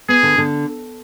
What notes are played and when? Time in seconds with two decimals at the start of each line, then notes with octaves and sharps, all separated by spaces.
0.09 B3 G#4
0.23 D3
0.38 D3